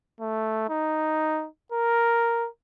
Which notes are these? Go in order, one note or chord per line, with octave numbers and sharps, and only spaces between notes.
A3
D#4
A#4